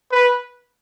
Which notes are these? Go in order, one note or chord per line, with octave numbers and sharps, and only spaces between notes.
B4